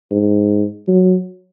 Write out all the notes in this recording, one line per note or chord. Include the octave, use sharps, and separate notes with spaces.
G#2
F#3